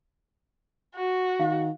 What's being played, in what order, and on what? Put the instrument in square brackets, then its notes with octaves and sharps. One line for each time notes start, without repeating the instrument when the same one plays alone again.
[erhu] F#4
[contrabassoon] D#3 [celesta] F5